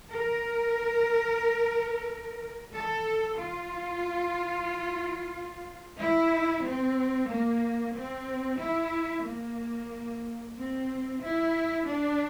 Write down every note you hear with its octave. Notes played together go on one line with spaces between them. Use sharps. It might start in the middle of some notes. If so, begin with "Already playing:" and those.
A#4
A4
F4
E4
C4
A#3
C4
E4
A#3
C4
E4
D4